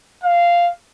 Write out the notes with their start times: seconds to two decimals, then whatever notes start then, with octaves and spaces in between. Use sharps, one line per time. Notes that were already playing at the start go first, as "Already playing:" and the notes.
0.24 F5